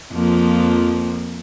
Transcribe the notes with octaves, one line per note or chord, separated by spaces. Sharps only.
F2 F3 A#3